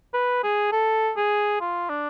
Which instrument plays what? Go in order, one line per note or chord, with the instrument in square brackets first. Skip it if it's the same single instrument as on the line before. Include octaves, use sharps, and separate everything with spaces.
[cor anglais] B4
G#4
A4
G#4
F4
D4